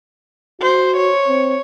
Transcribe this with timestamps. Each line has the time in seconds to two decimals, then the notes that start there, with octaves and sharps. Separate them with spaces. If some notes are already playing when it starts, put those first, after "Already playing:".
0.62 F#4 C5
0.97 C#5
1.28 C4